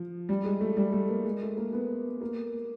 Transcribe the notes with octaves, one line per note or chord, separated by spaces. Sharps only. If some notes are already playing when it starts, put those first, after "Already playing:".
Already playing: F3
G3
G#3
A3
G3
A3
A#3
G#3
A3
A#3
B3
A#3